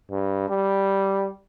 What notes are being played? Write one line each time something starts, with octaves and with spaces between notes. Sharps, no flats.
G2
G3